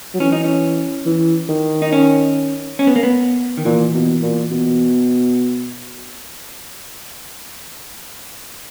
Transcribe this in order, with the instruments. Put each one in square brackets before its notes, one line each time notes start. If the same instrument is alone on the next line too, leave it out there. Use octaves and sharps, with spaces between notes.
[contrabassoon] F#3
[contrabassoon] E3 [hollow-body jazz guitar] C#4
[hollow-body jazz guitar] D#4
C#4
[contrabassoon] E3
D#3
[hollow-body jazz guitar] D#4
C#4
C#4
B3
A#3
B3
D#3
[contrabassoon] A#2 [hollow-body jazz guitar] E3
[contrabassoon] B2
A#2
B2